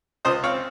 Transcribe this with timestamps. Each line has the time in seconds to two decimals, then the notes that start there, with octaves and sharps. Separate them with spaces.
0.25 C#2 C5 D#5
0.43 C4 C#5 F5